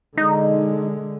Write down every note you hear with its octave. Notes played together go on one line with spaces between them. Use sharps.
D3 G#3 D#4